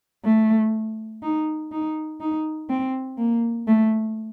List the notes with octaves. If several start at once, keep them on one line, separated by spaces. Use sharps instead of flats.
A3
D#4
D#4
D#4
C4
A#3
A3